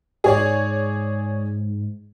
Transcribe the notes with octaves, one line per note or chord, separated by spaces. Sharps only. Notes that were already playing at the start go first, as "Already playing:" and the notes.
G#2 G#4 C#5 D5